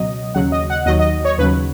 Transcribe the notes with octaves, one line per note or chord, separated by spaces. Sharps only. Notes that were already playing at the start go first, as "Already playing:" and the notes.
Already playing: C#2 B2 F#3 D#5
D#2 C#3 F#3 F#5
D#5
F#5
D#2 D#3 F#3 D#5
D#5
C#5
D#2 C#3 F#3 B4